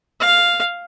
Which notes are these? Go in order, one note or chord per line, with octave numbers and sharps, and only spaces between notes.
F5